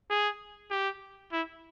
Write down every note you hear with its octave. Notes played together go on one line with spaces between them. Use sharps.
G#4
G4
E4